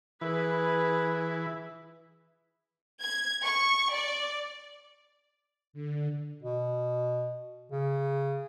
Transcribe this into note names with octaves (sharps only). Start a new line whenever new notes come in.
E3 E4 G#4 B4
G#6
C#6
D5
D3
B2
C#3